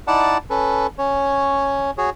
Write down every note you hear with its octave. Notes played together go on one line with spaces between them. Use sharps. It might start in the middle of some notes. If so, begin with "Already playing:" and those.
D#4 E4 D5 F#5 A5
C#4 A4 B4
C#4 C#5
F#4 G#4 C#5